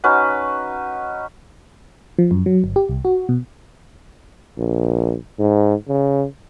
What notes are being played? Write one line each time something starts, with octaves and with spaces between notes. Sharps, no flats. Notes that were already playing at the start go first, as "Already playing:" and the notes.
C#4 D#4 F#4 B4
F3
F#2
F#3
G1
G4
C2
F#4
B2
A#1
G#2
C#3